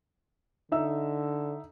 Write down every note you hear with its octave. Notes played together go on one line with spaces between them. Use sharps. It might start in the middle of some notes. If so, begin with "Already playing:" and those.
D3 D#4 E5 E6